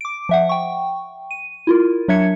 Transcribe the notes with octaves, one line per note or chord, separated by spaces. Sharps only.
D6 D7
F3 E5 F#5
G5 C#6
D#7
E4 F4 A#4
F#3 D4 E5 G#6 C#7